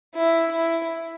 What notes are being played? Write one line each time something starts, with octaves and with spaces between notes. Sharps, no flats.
E4
E4